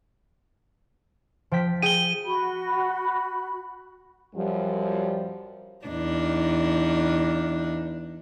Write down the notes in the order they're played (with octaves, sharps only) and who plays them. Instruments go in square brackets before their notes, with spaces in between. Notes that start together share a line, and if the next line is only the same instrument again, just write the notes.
[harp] F3 G5 B6
[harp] G#4 G5 [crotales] D#7 G7
[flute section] F#4 B5
[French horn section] F#2 F3 G3
[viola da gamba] E2 D4 D#4